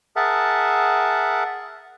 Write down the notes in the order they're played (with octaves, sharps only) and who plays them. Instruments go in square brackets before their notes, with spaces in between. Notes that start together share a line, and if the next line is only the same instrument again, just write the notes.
[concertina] G#4 A#4 E5 F#5 A5